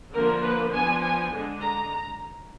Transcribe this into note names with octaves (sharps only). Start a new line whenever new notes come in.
D3 F3 A#3 D4 A#4
B4
F3 B3 D4 G#5
G#5
D3 G#3 D4
A#5